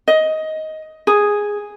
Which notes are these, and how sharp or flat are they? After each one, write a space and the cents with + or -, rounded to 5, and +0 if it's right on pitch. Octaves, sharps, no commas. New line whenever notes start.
D#5 +15
G#4 -5